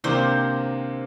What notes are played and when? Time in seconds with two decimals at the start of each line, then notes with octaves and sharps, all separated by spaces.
0.04 C3 D#3 A#3 D4 C5